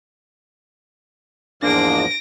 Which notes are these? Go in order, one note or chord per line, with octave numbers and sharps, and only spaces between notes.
E2 G#2 F3 G#3 A#3 D4 A#6 D7